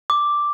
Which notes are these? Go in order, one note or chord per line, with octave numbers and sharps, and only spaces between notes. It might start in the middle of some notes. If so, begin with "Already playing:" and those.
D6